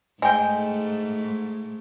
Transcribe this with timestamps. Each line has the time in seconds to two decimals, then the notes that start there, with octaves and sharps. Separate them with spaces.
0.22 G#2 G#3 A3 G5